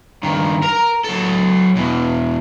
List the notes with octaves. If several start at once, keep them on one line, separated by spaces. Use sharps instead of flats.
G2 D#3
A#4 A#5
F#3 A4
E2 B2